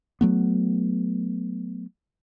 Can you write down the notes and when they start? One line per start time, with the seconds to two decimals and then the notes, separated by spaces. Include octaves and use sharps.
0.21 F#3 A3 B3